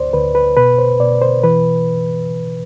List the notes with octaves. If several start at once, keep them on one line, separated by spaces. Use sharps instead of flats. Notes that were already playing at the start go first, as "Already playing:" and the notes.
Already playing: D2 C5 D5
D2 B4
B4
B2 B4
C5
B2 D5
C5
E3 B4